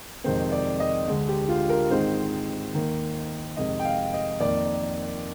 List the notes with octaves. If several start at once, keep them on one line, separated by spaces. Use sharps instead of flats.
F2 C3 D#3 G#3 C4 C5
D5
D#5
D2 D3 G#3
G4
F4
A#4
G#2 D#3 G#3 C4 C5
D#2 D#3 A#3
F2 C3 D#3 G#3 D#5
G5
F5
D#5
F2 D#3 A#3 D5